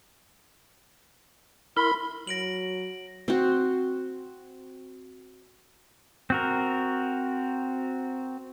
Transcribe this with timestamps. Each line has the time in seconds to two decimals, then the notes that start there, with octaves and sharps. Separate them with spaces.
1.77 E4 A#4 B5 C6
2.27 F#3 A#6 D7 F#7
3.28 C4 F#4
6.30 C4 F#4 A#4